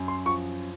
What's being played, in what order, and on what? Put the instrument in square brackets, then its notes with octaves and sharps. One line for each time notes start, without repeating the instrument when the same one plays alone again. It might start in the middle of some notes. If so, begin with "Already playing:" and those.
Already playing: [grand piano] F#2
C6
F3 C#6